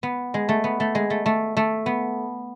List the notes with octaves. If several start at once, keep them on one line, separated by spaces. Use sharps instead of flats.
B3
G#3
A3
B3
A3
G#3
A3
A3
A3
B3